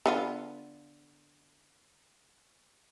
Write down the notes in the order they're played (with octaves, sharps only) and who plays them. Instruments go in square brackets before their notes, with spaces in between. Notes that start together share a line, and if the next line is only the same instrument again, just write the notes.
[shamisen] D3 B3 F4